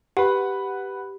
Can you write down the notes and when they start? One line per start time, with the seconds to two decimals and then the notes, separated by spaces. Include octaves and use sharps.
0.17 G4 B4 F#5